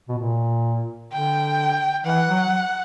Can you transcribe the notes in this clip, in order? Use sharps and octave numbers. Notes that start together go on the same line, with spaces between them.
B2
A#2
D3 G5
E3 F#5
F#3